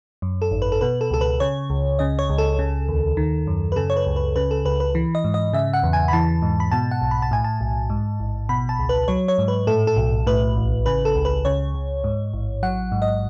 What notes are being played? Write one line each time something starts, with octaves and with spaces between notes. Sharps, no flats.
F#2
A4
G#1
B4
A4
B2 B4
A4
C#2 A4
B4
C#3 C#5
C#2
C#3 D#5
C#5
C#2
A4
C#3
D#2
D#3
F#2
B4
C#3 A4
C#5
B4
C#2
B4
C#3 B4
A4
C#2 B4
B4
E3
D#5
G#2
D#5
C#3 E5
F#5
E2
G#5
B5
E3 A5
G#2
B5
B2 A5
F#5
B1
B5
A5
A2 G#5
A5
B1
G#2
A1
B2 B5
A5
C#2
B4
F#3 C#5
C#5
G#2
B4
A2 A4
A4
B1
A2 B4
A1
C#3 B4
A4
C#2
B4
C#3 C#5
C#2
G#2
A1
F#3 F#5
G#2
D#5